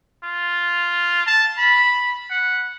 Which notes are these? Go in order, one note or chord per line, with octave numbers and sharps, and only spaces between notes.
F4
A5
B5
F#5